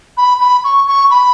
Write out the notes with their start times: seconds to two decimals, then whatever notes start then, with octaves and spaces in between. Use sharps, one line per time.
0.17 B5
0.41 B5
0.64 C#6
0.87 C#6
1.11 B5